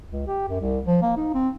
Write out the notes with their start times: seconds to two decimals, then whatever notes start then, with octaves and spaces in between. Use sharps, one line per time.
0.11 C#2
0.28 G4
0.48 F#2
0.61 C2
0.87 F3
1.02 A#3
1.17 D#4
1.34 C4